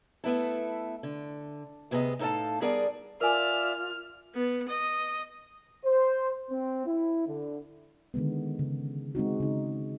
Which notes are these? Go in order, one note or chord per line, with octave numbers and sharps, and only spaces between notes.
A3 B3 E4 A4
D3
D2 C3 B3 G#4 D#5
A2 D#4 A4 C5 F5 A5
G3 B3 G#4 A#4 D5
F4 A#4 D5 E5 G#5 D6 F6
B3
D#5
C5
C4
E4
D3
D3 D#3 G#3 B3
C#3
G#3 C4 D#4 F#4
C#3 D#4